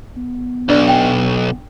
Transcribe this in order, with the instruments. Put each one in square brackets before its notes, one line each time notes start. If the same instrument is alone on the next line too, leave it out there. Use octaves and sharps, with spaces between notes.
[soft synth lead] B3
[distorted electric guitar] B1 [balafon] D4 D5
[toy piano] G5 G#5